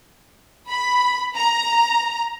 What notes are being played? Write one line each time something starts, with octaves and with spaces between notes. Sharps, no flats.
B5
A#5